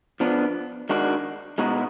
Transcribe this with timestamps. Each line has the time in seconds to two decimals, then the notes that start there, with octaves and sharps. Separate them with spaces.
0.20 F3 B3 D4
0.89 D#3 G#3 D4 F#4
1.58 B2 G#3 D#4 F#4